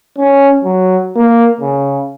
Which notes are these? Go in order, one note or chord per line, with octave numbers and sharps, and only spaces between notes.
C#4
F#3
A#3
C#3